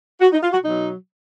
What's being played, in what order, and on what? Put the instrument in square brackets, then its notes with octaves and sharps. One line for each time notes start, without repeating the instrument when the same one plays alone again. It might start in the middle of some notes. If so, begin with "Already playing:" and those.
[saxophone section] F#4
D#4
F4
F#4
B2 F#3 D#4